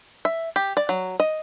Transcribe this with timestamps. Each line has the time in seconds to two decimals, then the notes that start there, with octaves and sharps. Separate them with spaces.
0.25 E5
0.56 G4
0.77 D5
0.89 F#3
1.20 D#5